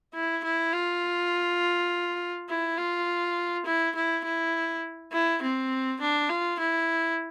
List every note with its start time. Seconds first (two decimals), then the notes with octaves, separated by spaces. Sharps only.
0.14 E4
0.44 E4
0.73 F4
2.49 E4
2.78 F4
3.66 E4
3.95 E4
4.25 E4
5.13 E4
5.42 C4
6.01 D4
6.29 F4
6.60 E4